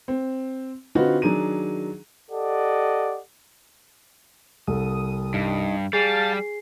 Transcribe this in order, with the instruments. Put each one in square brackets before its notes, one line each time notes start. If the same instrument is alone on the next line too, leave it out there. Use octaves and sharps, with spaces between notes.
[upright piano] C4
D3 C4 D#4 F4 F#4 B4
D#3 F#3 D4 G#4 A#5 D#7
[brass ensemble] G4 A4 D5 D#5 F#5
[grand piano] C2 A4 [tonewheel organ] D#6
[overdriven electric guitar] G2 [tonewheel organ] D#4 D#5
[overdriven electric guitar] G3 [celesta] G#4 C7 [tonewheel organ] F5 A5 A6 [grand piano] G#5